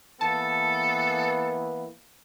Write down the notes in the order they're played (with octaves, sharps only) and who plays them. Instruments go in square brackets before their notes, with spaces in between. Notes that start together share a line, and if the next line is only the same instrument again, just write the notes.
[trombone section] E3 A#3 B3 [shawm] A4 [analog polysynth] A5